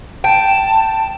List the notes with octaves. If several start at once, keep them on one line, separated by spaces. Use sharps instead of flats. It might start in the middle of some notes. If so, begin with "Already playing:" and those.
G5 A5